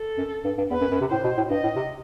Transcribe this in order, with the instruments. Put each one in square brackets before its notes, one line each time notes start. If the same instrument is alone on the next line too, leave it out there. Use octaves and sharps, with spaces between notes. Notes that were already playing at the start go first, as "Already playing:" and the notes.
Already playing: [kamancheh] A4
[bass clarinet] F#2
G2
G2
[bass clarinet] E2 [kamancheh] B4
[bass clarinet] F#2
F#2
C3
[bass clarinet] A2 [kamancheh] C5
[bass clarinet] B2
A2
[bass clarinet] G2 [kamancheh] D#5
[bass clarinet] A2
C3